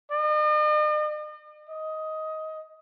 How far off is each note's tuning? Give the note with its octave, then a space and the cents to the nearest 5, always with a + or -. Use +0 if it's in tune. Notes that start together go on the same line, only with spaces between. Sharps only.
D#5 -45
D#5 +15